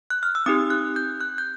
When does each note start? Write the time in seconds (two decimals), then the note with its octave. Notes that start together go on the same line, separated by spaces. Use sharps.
0.10 F#6
0.23 F6
0.35 E6
0.46 C4 D#4 G4 D#6
0.70 F#6
0.96 G6
1.21 F#6
1.38 G6